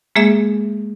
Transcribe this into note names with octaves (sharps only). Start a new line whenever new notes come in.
G#3 A#3 G#4 E5